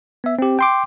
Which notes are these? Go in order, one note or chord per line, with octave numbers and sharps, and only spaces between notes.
B3 E5
C4 G4
G5 C6 D6